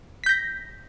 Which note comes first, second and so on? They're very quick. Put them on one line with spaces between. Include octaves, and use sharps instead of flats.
B6 G6 A#6